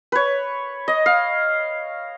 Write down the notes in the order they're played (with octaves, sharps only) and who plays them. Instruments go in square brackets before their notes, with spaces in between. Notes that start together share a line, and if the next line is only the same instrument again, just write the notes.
[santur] B4 C#5
D#5
F5